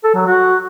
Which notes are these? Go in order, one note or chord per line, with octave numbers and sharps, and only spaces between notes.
A4
F#3
F#4